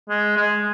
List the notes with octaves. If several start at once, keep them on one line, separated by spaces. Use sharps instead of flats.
G#3
G#3